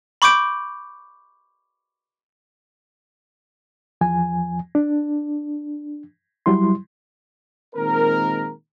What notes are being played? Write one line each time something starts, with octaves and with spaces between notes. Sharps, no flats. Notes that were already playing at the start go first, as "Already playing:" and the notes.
B5 C#6 D6 G6 D7
E2 F3 G#5
D4
F#3 G3 E4 C6
A#2 D#3 G#3 C4 A#4